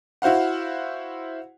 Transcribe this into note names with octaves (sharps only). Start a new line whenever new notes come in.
E4 F#4 C5 F5 F#5